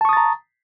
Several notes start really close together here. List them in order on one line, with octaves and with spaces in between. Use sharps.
A5 C#6 D#6 A6 A#5